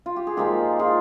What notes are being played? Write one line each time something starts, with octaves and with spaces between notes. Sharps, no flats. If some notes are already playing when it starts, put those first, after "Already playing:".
F4
G4
G#4
A#2 F3 G#3 D#4 G4 A#4
F4 G#4